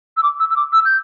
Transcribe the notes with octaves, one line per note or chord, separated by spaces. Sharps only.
E6
D6
E6
E6
D6
E6
G6